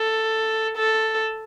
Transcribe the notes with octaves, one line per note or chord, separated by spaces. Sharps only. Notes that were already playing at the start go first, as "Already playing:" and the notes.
Already playing: A4
A4